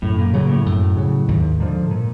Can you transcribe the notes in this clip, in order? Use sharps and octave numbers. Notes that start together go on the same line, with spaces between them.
F#2 A2
A#2
A#2 C#3 F#3
A2
F#2
C#3 F#3
D#2 G#2
G#2 D3 F3
A#2